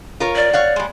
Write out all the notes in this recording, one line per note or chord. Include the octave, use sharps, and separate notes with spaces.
F4 A#4 C#5
D5
C#5 F5 F#5
G3 G#3